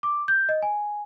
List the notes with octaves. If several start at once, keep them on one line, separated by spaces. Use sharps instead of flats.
D6
G6
D#5
G#5